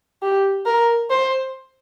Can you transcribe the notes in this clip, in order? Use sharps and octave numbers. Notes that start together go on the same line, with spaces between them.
G4
A#4
C5